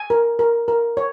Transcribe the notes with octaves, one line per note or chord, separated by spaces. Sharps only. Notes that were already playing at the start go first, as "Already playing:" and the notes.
Already playing: G#5
A#4
A#4
A#4
C#5